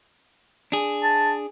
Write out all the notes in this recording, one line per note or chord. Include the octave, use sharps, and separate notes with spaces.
D4 G#4
A5